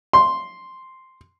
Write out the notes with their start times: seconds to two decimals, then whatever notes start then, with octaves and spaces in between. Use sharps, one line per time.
0.13 C6